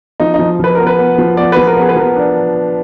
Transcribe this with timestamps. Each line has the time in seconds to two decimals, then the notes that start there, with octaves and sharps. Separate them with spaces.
0.20 F3 D#4
0.34 D#4
0.39 F3
0.60 F3 B4
0.75 B3 A#4
0.87 B4
0.99 B3
1.18 F3
1.37 B3 D5
1.52 F3 B4
1.67 A#4
1.77 B3 G#4
1.89 B4
1.96 F3 A#4
2.16 D4